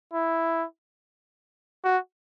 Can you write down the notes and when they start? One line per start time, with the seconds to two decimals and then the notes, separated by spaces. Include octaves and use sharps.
0.13 E4
1.84 F#4